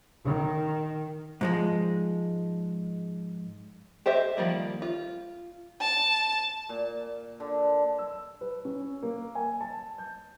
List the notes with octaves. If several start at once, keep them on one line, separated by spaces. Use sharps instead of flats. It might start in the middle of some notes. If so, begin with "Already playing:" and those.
D#3
G#2 F3 G#3
G4 C5 D#5 E5
D#3 F3 G3 A#3
F4
A5
A#2
D3
E6
B4
C#4
A#3
G#5
A5
G6